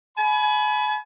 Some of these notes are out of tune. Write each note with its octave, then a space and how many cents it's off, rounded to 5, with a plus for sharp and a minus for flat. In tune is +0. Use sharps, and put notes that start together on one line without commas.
G#5 +35 B5 +0